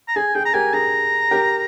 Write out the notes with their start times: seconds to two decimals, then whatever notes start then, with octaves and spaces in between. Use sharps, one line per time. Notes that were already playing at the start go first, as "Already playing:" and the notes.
0.08 A#5
0.16 G#4 G#5
0.35 G#4 G5
0.45 A#5
0.54 G4 A#4 G#5
0.74 G#4 A#5
1.31 G4 A#4